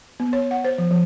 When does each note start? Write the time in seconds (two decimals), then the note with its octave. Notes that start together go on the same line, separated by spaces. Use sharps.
0.20 B3
0.33 C#5
0.51 F#5
0.64 C5
0.78 F3
0.91 F3